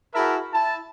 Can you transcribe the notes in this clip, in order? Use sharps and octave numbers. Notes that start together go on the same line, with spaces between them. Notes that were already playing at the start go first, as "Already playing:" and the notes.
E4 F#4 G#4 A#4 E5 A5
E4 A5